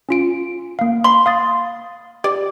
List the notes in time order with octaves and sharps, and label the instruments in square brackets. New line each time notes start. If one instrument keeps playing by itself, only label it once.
[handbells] C#4 F4 D7
A#3 F5
[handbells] B5 [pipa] C6
[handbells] F5 D#6 A6
[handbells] G4 [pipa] D5